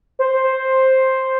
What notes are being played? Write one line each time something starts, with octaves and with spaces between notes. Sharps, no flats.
C5